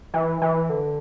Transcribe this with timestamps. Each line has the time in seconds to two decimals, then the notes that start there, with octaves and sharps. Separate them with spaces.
0.14 E3
0.42 E3
0.70 D3